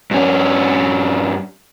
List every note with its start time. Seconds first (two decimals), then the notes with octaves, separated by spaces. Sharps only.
0.11 G2 C#4